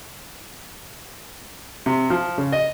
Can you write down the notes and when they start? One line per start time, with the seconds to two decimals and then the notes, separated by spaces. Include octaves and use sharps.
1.86 C3
2.10 F3
2.38 C#3
2.52 D#5